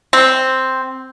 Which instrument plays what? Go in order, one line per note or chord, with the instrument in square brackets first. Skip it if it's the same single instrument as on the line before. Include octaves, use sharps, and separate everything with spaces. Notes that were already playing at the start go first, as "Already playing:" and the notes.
[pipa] C4